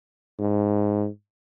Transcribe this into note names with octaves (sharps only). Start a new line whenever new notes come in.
G#2